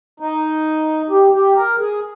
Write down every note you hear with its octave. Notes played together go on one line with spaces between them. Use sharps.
D#4
G4
G4
A#4
G#4